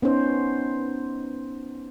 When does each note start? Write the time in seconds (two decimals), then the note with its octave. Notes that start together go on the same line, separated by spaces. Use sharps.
0.02 B3 C#4 D#4 C5